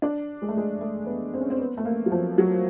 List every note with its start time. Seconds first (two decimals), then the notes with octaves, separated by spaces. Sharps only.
0.02 D4
0.42 G#3
0.49 A3
0.57 G#3
0.81 A3
1.06 B3
1.34 C4
1.41 C#4
1.50 C4
1.59 B3
1.77 A3
1.85 A#3
2.06 F#3
2.12 F3
2.38 F#3